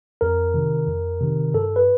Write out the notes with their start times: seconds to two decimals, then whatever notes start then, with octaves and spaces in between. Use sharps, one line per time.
0.21 F2 A#4
0.54 C3 D#3
0.88 F2
1.21 C3 D#3
1.54 G2 A4
1.76 B4